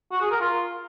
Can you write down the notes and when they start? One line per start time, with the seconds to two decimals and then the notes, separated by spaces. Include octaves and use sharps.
0.11 F#4
0.21 G#4
0.31 A#4
0.41 F4